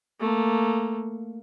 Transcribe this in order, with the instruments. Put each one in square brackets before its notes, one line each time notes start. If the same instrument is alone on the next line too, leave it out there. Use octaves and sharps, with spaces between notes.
[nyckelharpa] A3 A#3